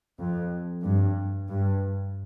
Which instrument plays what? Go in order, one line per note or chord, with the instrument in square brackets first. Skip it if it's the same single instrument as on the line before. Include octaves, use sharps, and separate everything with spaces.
[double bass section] F2
G2
G2